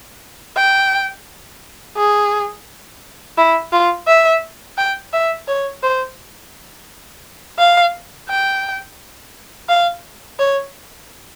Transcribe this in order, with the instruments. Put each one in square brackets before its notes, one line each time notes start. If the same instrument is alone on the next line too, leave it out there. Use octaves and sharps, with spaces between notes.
[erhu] G5
G#4
E4
F4
E5
G5
E5
C#5
C5
F5
G5
F5
C#5